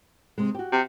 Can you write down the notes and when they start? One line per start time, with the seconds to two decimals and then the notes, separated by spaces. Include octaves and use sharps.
0.38 C3 G#3
0.55 F#4 G4
0.72 C3